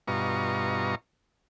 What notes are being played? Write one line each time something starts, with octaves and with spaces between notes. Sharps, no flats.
G2 B2 F4 D#5 A#5 C#6